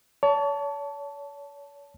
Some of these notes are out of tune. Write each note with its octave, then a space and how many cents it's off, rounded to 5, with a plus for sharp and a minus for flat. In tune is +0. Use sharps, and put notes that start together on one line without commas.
C#5 +40 A5 +0